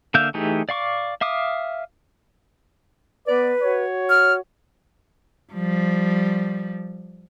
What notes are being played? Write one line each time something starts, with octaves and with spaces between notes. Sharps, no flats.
D3 A#3 E5 F5 G6
E3 A3 D#4 G4 G#4
D5 F5 C#6 D6
E5 F5 D6 D#6
B3 B4 D5
F#4 C#5
F6
F3 G3